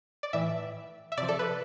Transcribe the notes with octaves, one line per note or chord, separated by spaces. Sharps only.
D5
A2 E3 E5
E5
C3 F3 D5
A4
B4